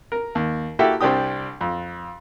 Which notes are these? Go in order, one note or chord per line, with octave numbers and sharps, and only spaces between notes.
A#4
D#2
A#3 E4 F#4 G4 A4 E5
C2 C4 D4 G4 D#6
F2